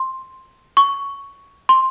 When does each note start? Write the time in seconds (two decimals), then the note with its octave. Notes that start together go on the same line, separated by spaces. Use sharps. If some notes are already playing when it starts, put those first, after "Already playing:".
Already playing: C6
0.77 C#6
1.69 C6